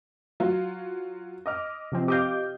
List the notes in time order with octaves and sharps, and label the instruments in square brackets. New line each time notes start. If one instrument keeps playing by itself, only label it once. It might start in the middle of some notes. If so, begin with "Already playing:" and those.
[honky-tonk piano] F#3 F4
D#5 D6 F6
[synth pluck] C3 F3 C4
[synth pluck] G4 D#5 F5 [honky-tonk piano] D6 G6